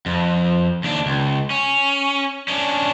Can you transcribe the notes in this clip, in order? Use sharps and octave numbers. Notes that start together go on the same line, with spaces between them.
F2
D#2 D4
C#2
C#4
C#4 D4